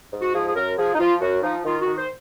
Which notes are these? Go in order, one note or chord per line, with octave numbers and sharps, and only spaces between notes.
G#2
F#4
F3 G#4
G#4
F#2 A#4
F3 G#4
D#4
F3 F4
F#2 F#4
F3 D#4
D#3 F4
F#4
D#3
C5